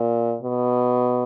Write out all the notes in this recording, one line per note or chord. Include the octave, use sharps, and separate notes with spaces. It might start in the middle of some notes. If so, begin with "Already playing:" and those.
Already playing: A#2
B2